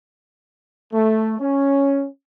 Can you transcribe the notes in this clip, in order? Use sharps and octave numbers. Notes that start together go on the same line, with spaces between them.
A3
C#4